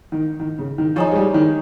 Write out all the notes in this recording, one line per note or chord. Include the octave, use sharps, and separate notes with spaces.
D#3
D#3
C#3
D#3
F3 D#4 G#4 C#5
G#3
G3
D#3